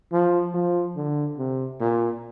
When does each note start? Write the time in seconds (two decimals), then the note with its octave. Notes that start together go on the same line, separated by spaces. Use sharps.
0.13 F3
0.54 F3
0.96 D3
1.38 C3
1.80 A#2